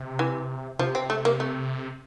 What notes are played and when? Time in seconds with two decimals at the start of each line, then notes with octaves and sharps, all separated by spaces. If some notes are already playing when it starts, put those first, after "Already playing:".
Already playing: C3
0.19 E3
0.79 C3 F3
0.95 C4
1.10 A3
1.25 A#3
1.40 A3